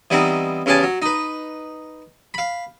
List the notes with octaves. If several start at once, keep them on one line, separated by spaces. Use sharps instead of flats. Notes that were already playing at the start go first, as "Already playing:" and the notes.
E3 G3 B3 C4 D#4
E2 C#3 G4 G#4 G#5 A5
F#3
D#4 B4
F5 B5